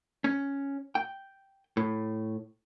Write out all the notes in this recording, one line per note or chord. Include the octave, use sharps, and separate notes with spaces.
C#4
G5
A2